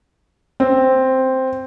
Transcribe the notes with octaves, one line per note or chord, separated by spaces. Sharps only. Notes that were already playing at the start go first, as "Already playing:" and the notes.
C4